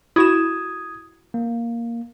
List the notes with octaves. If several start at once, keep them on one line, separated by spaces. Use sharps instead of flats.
E4 F#4 D#6 G#6 E7
A#3